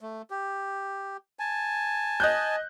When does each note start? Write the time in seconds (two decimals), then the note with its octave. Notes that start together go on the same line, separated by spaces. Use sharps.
0.01 A3
0.30 G4
1.39 G#5 A5
2.20 D#5 F#6 G6